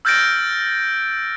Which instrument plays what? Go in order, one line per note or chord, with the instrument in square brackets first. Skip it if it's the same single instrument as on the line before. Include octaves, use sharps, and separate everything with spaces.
[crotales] E6 F6 G6 A6 A#6 D7